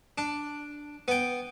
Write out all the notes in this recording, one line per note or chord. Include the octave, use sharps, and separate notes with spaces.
D4
B3 G5